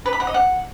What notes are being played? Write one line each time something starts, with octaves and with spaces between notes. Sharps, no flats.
B4
B5
F#5
D#5
F#5